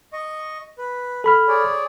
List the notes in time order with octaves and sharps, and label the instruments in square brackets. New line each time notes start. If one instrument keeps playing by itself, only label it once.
[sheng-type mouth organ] D#5 C#6
B4
[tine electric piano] A4 B5 F6
[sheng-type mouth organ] G#4 C#5 D5